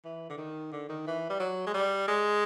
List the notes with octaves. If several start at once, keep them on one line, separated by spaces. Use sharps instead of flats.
E3
D3
D#3
D3
D#3
E3
G3
F#3
G#3
G3
G#3